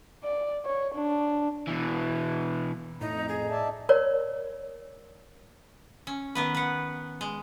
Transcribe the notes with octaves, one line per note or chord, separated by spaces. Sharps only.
D5
C#5
D4
B2 E3
F2 A2 D#4 A#5
G#4 D#5
D5 E5 A5
A#4 C#5 D5
C#4
D#3 B3 B4
B4 F#5
G#3